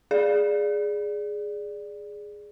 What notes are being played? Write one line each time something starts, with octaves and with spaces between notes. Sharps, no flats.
G#4 D5